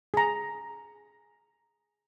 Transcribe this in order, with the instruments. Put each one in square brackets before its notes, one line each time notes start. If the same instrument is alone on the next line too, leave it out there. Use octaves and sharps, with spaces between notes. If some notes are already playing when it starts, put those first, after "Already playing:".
[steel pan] G#4 A#5